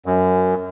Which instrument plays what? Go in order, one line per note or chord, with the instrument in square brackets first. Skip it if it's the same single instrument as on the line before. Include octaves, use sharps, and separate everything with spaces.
[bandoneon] F#2